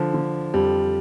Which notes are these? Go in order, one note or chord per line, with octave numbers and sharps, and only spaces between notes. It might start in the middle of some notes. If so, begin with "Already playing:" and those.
Already playing: D3 F3
D3
F2 G3